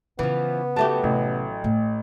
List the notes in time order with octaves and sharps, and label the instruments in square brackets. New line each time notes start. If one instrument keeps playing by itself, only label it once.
[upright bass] C#3 [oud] E3 F3 [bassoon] B3
[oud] F#3 A3 G4 [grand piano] A5
[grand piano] A1 [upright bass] C3 C#4
[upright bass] A2